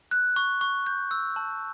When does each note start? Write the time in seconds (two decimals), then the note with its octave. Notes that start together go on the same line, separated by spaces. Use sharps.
0.11 F#6
0.36 C#6
0.61 C#6
0.87 G6
1.11 E6
1.36 A5